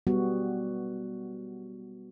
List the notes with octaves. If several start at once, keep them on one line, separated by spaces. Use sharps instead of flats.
G3 B3 F#4